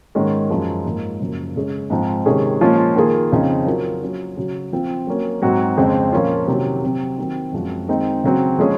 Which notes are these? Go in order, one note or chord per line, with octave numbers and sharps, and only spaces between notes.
G#2 D#3 G#3 C#4
F#2 F3 G#3
G#2 F3 A#3
F#2 C#3 F3 A#3
C#3 G#3 C#4 G#4
G#2 F3 C4 D#4
C3 D#3 G#3 C#4 G#4
A#2 F3 G#3 C#4 F4
D#3 A#3 F4 G#4
F2 C#3 F3 C4 D#4
F#3 C#4 F4 A#4
F#3 C#4 F4
C#3 F#3 C#4 F#4
F3 C4 F4
F#3 A#3 C#4
G#2 F#3 C4 F#4
F2 C#3 G#3 C4
A#2 F3 A#3 C#4 F4
C3 D#3 F#3 C#4
C3 F#3 C4 F#4
D#3 F#3 C4
F#2 F3 G#3 C4 F#4
D#3 G#3 C4 D#4
C#3 F#3 C4
F3 G#3 C#4 G#4